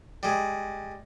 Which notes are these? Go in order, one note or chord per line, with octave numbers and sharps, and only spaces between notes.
G3 G#3